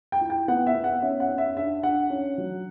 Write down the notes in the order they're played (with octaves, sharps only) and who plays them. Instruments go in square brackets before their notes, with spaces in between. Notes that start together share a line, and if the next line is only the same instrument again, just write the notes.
[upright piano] G5
E4
G5
B3 F#5
E5
B3
F#5
C#4 E5
F#5
C#4
E5
D4 E5
D4 F#5
C#4
F#3